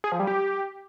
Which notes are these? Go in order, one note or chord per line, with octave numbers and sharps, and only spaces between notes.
G#4
F3
G3
G4